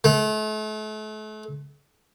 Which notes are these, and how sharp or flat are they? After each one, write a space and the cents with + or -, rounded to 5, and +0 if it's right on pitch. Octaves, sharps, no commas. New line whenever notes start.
A3 -40